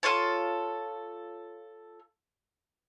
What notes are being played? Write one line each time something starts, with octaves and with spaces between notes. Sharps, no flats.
F4 A4 C#5 A5